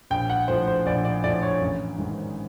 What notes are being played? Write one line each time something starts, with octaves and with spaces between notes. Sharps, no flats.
A#1 G5
F#5
A2 F3 C5
C5
A#1 D5
D5
A2 F3 D5
C#5
A1
G#2 D#3